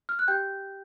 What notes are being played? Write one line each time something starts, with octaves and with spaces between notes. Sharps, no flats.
F6
F#6
G4 G5 G6